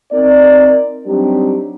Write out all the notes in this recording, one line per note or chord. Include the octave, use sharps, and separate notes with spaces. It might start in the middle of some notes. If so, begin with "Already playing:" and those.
C4 D#4 A#4 D5
F#3 G3 C4 D4 D#4 G4